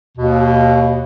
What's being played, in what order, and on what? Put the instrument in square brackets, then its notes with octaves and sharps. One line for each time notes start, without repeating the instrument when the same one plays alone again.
[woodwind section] D#2 B2